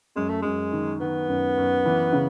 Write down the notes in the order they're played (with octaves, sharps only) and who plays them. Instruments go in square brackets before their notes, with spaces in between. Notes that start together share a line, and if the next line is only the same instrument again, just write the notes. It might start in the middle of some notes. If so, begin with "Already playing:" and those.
[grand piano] F#2 [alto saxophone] G#3
[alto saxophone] A3
[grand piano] F#2 [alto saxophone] G#3
[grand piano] D#3
[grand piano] D#3 [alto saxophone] B3
[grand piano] F#2
F#2
E3
C#3